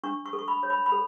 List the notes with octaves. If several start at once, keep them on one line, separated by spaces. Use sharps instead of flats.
D4 C#6
C#6
A4
C#6
B5
C#5
B5
B5
A4